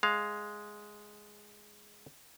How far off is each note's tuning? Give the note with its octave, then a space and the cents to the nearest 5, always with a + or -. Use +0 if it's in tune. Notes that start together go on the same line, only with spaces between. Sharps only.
G#3 +0 F5 +0